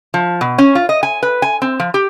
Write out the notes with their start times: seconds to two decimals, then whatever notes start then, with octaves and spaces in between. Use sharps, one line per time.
0.14 F3
0.41 B2
0.58 C#4
0.75 F4
0.89 D#5
1.03 G#5
1.23 B4
1.42 G#5
1.62 C4
1.79 F3
1.94 G4